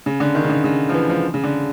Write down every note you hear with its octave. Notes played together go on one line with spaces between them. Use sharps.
C#3
D3
D#3
C#3
D3
C#3
F3
E3
F3
C#3
D3